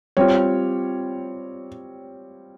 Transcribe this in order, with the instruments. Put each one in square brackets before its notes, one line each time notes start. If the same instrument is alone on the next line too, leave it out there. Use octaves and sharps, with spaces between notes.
[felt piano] G3 C4 F4 C#5